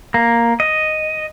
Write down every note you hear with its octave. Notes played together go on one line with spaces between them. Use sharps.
A#3
D#5